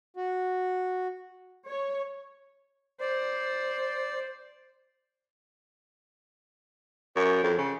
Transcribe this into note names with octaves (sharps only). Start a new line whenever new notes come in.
F#4
C#5
C5 D5
F#2
F2
C#3